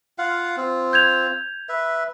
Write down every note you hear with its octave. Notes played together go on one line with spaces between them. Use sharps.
F4 F5 F#5
C4 F4
G6 G#6 F7
B4 E5